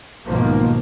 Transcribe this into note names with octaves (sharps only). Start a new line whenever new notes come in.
B1 G#2 B2 D#3 F3 A#3